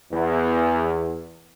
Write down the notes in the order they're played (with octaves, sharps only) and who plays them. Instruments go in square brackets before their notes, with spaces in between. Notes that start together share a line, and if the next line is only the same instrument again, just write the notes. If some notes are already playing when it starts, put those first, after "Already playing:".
[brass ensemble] E2